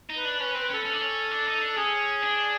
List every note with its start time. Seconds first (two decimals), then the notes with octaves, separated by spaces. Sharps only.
0.10 D#4
0.17 B4
0.25 D4
0.40 C#4 B4
0.52 B4
0.55 C4
0.62 B4
0.70 C#4 A4
0.85 C#4
0.93 D4
1.01 C#4
1.31 D4
1.46 D#4
1.61 D4
1.77 C#4 G#4
2.23 D4